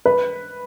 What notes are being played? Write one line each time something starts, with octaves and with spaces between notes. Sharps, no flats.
B4